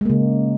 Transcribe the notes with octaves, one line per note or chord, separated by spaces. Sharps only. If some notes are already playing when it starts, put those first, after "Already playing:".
C#3 G#3 A#3